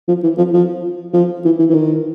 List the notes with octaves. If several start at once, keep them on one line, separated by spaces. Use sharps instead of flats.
F3
E3
F3
F3
F3
E3
E3
E3
D#3